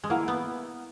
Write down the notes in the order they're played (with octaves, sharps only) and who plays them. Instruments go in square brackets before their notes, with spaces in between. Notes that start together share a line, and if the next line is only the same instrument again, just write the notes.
[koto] G#3
[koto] A#3 [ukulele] E4 G#4 B4 F#5
[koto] B3